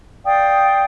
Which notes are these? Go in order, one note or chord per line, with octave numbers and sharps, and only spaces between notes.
D5 F5 G5 D#6